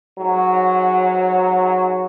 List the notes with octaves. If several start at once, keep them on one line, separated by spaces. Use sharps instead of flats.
G#2 F#3